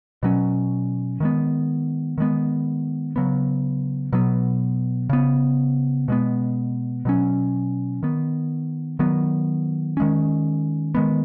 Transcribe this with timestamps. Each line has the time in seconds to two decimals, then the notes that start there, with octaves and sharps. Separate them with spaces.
0.23 B2 F#3 C#4
1.20 D#3 G#3 B3
2.18 D#3 G#3 B3
3.16 C#3 F#3 B3
4.13 B2 F#3 B3
5.10 C#3 B3
6.08 B2 G#3 B3
7.05 B2 F#3 C#4
8.03 D#3 B3
8.99 D#3 F#3 B3
9.97 D#3 G#3 C#4
10.95 D#3 G#3 B3